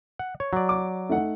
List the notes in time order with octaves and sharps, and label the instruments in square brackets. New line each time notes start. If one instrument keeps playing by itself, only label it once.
[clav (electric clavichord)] F#5
C#5
F#3 D5
[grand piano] D6
A3 D#4 F#5